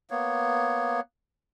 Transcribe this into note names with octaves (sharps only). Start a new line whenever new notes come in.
A#3 B3 C#5